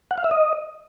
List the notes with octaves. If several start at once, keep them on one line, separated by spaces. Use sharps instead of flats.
F#5
F5
E5
D#5